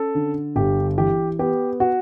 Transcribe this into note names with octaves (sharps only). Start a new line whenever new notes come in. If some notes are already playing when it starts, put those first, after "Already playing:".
Already playing: C#4 A4
D3
G1 G4
E3 G4
B3 G4
F#4